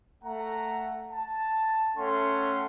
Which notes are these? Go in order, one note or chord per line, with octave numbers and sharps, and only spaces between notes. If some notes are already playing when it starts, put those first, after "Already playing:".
A3 F#5 A#5
A5
A3 C#4 A4 F#5 G5 C6